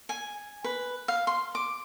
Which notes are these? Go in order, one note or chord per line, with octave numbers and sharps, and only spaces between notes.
G#5
B4
F5
C6
D6